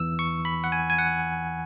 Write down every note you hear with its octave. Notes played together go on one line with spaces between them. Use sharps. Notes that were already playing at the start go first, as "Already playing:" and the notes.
Already playing: E2 E3 E6
C#6
B5
F#5
G#5
G#5
F#5